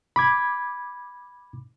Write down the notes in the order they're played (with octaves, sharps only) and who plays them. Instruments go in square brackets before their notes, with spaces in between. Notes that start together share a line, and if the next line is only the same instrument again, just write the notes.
[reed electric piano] B5 D6 G#6